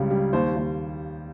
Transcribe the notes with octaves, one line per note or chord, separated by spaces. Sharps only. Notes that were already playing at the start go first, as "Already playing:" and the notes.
Already playing: C#2 C#3 G3
G3
D#2 C5
D#2